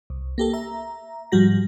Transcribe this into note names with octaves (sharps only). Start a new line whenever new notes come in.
C2
A#3 G4 A4
E5 A#5
G#2 F3 G3 F#4 A#6